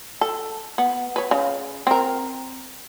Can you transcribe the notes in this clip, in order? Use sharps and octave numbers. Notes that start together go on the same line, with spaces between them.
A4
B3
B4 C#5
C#3
C4 A#4